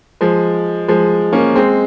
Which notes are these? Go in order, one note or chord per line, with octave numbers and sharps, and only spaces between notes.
F3 G#3
F3 G#3
A#3 C#4
G#3 C4